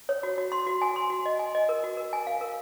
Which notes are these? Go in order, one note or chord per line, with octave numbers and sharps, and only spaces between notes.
C#5
F#4
F#4
C6
F#4
G#5
C6
F#4
D#5
G#5
D#5
A#4
F#4
A#4
G#5
F5
A#4